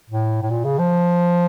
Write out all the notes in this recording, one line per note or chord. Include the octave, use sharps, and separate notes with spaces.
A2
A2
A#2
C#3
F3